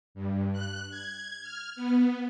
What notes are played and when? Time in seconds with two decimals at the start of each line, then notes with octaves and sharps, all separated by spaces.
0.15 G2
0.53 F#6
0.90 G#6
1.42 F6
1.76 B3